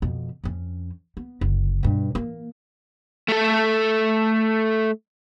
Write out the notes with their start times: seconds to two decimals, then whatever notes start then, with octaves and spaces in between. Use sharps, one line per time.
0.02 F2 B2
0.44 F2 C#4
1.17 B3
1.41 F#1 D3
1.83 G2 B2
2.15 E3 A#3
3.28 A3 A4